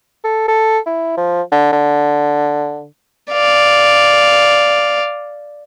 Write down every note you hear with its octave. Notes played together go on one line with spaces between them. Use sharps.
A4
A4
E4
F3
D3
D3
D5 F5